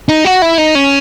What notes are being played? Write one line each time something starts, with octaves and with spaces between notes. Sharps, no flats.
D#4
F#4
E4
D#4
C#4